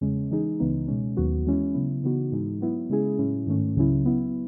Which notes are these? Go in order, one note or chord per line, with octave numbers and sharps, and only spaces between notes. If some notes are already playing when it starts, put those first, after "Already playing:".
E2 C#3 G#3 C#4
E3 G#3 D#4 G#4
C#2 C#3 E3 B3 D#4
B2 G#3 C#4
D#2 D#3 F#3 B3 F#4
E3 G#3 C#4 E4
C#3 F#3 B3 E4
C#3 E3 B3 D#4 F#4
G#2 E3 G#3 D#4
F#3 B3 E4
C#3 G#3 C#4 E4 G#4
A2 F#3 C#4 E4
G#2 D#3 A3 C#4
C#2 C#3 F#3 C#4 E4
F#3 B3 E4